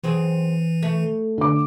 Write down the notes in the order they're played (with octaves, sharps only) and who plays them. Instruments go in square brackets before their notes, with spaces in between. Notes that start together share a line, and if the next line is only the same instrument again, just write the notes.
[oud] F#2 C4 G#4 [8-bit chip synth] E3
[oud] A3
[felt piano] D3 D6